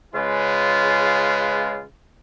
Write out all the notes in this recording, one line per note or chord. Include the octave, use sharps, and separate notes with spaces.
C#3 G#3 F4 B4